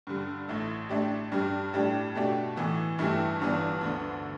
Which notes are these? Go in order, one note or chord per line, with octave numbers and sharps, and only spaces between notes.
G2 D3 G3
A1 A2 A3
A2 A3 D4 G4
G2 G3 D4 G4
A2 G3 D4 G4
B2 A3 D4 G4
A2 E3 B3
G2 E3 A3 E4 G4
G1 G2 E3 B3 D4
D2 D3 B3